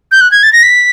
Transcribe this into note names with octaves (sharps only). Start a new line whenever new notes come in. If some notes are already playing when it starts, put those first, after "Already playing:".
G6
F#6
G#6
A6
A#6
B6